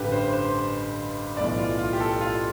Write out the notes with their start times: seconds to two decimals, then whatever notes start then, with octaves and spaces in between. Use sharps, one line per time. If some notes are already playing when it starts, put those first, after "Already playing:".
Already playing: A1 G2 D3 G4 B4
0.12 C5
0.33 C5
1.37 B1 A2 E3 D5
1.58 F4
1.78 F4
1.93 G4
2.00 A4
2.21 F4